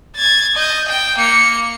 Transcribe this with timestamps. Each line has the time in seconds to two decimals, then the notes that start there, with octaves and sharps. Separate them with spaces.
0.16 G#6 A6
0.55 D#5 G6
0.88 G5
1.18 A#3 C#7